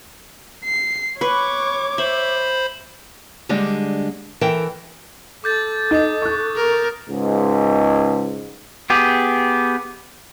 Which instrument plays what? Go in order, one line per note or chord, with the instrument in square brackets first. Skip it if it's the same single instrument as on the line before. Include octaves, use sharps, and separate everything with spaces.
[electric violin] C7
[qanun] B4 [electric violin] C#5 D6 [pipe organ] C#6
[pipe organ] C5 B5 [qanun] E5
[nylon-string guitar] D3 G3 G#3 D4
E3 A4 A#4 G5
[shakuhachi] A4 [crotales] D6 G6 A6
[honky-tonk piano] D#4 [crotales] D#6 G6
[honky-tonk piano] C#6 F#6
[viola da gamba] A#4
[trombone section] C#2 G#2
[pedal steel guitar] B3 G4 G#4